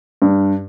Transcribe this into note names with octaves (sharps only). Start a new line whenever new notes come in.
G2